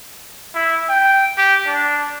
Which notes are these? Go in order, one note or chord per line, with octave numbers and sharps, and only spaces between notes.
E4
G5
G4
D4